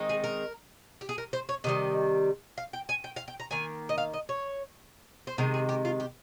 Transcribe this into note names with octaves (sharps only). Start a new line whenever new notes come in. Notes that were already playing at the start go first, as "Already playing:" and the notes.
Already playing: D#3 G#3 C4 D#4
G#4
A#4
G4
G#4
A#4
C5
C#5
C3 D#3 G3 D#5
F5
G5
G#5
G5
F5
G5
A#5
D#3 A#3 G#5
D#5
F5
D#5
C#5
C5
C3 D#3 G#3 A#4
G#4
G4
F4
G4